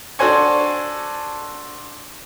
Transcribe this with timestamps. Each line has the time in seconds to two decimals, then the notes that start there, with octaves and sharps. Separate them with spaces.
0.19 D4 F#4 A4 C5 G#5 C#6